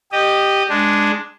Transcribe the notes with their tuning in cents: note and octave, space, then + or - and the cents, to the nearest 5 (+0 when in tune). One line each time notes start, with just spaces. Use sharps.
G4 +0 D#5 -15
G#3 +0 D4 +0